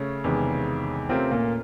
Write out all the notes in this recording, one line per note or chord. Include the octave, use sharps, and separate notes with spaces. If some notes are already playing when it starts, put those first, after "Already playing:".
Already playing: C#3 A3 C#4
E2 C3 D#3 G#3
C3 A3 C4 C#4 F4 A#4
A#2 A#3